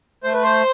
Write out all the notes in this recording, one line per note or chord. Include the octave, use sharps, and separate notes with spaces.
A3 C5
B4
C5